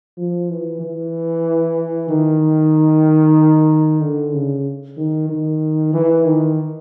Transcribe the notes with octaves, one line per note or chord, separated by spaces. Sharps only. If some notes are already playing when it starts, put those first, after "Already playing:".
F3
E3
E3
D#3
D3
C#3
D#3
D#3
E3
D#3